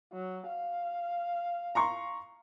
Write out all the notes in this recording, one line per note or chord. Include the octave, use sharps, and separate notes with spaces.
F#3
F5
A#5 C6 C#6